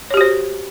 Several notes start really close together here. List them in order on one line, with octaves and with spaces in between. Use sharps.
C#5 G4 F#4 C5